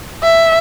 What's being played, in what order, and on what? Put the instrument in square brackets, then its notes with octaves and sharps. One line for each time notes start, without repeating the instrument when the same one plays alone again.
[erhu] E5